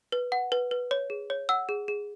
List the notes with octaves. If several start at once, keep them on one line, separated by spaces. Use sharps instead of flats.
B4
F#5
B4
B4
C#5
G#4
C#5
F#5 E6
G#4
G#4